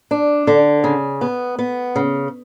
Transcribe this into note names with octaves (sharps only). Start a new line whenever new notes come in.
D4
D3
C#3
B3
B3
C#3